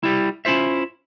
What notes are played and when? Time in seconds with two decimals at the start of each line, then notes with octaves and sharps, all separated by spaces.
0.03 G3 E4
0.45 C#4 E4 F4 C5 E5